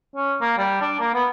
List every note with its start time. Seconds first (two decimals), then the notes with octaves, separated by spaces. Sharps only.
0.16 C#4
0.41 A#3
0.58 G3
0.81 D4
1.00 A#3
1.14 B3